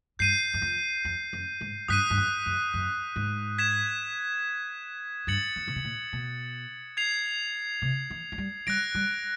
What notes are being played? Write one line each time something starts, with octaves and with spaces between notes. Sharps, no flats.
G2 G6 C7 D#7
F#2
F2
F2
F#2
G#2
G2 D#6 F#6 B6 D#7
G2
F#2
F#2
F#2
G#2
G#6 B6 E7
G2 A6 C#7 F#7
F2
C3
B2
A#2
B2
G#6 C7 F7
C3
E3
F#3
G3
G3 F#6 A#6 D7
G3